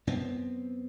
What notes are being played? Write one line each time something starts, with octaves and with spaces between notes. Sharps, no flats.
F#2 B3 C4